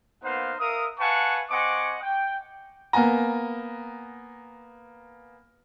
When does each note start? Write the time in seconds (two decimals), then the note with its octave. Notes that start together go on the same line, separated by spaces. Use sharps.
0.23 A#3 B3 D#4 C5 F5 F#5
0.60 A#4 E5 F5 D#6
1.00 B4 F5 F#5 G#5 A5 C#6
1.50 C4 D#5 F#5 G#5 C#6 D6
2.02 G5
2.93 A#3 B3 G#5 A#5